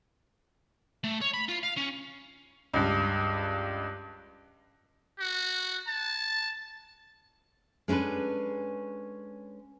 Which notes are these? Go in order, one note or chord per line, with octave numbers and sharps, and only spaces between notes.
A3
C#5
B5
F4
F5
C#4
C#2 G2
F#4
A5
G#3 C#4 D4 A4 B4